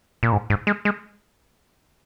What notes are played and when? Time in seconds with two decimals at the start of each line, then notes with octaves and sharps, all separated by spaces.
0.23 A#2
0.32 G#2
0.50 G#2
0.67 G#3
0.85 G#3